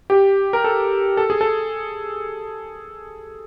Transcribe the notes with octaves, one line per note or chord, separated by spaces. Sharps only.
G4
A#4
A4
A4
G#4
A4